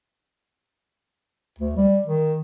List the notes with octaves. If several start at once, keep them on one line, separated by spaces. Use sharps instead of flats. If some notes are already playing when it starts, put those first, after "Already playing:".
D2
G3
D#3